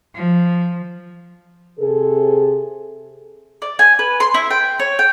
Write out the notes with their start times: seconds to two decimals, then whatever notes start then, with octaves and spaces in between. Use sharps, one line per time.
0.15 F3
1.79 C3 G#4 A4
3.62 D5
3.79 G#5
3.99 B4
4.20 C6
4.34 E4
4.50 G5
4.79 C#5
4.99 G5